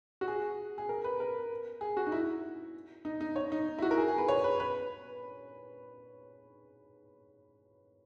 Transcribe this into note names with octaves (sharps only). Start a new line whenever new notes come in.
F#4
G#4
G#4
A#4
B4
A#4
G#4
F#4
D#4
E4
D#4
D#4
C#5
D#4
E4
F#4
A#4
G#4
G#4
B4
C#5
B4
B4